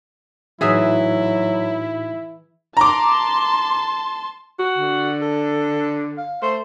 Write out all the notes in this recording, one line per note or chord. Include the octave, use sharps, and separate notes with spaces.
A2 E3 F#3 D#4 E4 F#4 G#4 E5
A5 A#5 C6 D6
F#4
D3
A4
F5
A3 C5